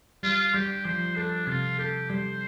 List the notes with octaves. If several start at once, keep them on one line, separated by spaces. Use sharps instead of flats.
G3 F4
G3 G4
F3 C5
D4 A4
C3 F4
G4 A4
G3 C5